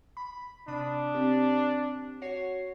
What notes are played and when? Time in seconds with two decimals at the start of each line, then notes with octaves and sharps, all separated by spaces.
0.17 B5
0.68 C3 D4 B5 D#6
1.14 C4 G4
2.22 F#4 C#5 C7